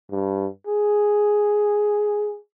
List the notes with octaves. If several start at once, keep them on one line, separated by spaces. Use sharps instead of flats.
G2
G#4